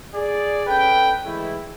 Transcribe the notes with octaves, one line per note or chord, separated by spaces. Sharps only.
G#4 D5
C#4 A4 B4 G5
E3 G#3 A3 E4